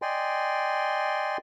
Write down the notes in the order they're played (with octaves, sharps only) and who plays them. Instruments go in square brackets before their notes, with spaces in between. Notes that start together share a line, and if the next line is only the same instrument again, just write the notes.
[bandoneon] D5 D#5 G5 G#5 C6